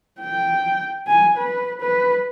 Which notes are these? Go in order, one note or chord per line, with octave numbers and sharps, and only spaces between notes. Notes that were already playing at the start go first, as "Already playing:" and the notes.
G5
G#5
B4
B4